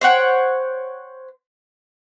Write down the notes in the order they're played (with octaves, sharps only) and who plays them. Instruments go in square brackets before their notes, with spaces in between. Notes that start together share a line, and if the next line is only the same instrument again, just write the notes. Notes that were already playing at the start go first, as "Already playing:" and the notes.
[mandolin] C5 C#5 F#5 G5